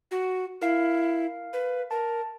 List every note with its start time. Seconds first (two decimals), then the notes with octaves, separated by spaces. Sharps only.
0.11 F#4
0.62 E4 A#4 F5
1.53 B4
1.91 A#4 A5